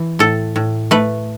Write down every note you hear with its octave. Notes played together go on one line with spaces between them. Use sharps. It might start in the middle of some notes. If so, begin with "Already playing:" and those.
Already playing: E3
A2 A4
A2
A3 B4